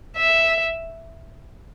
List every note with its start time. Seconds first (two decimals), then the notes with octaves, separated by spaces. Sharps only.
0.17 E5